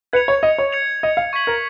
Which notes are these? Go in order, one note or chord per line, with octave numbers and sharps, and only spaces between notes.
B4 G#6 C#7 F7
C#5
D#5
C#5
G#6 C#7 F7
D#5
F5
C#6 G#6 B6 F#7
A#4